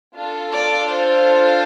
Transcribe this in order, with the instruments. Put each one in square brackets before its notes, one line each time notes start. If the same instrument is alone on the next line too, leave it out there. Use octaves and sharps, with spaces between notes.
[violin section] D4 F4 A4
D5
C5